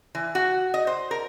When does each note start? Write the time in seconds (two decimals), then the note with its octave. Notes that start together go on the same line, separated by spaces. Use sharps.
0.15 E3
0.35 F#4
0.74 D#5
0.87 C5
1.11 A#4